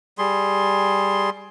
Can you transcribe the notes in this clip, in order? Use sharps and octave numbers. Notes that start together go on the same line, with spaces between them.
G3 G#4 C6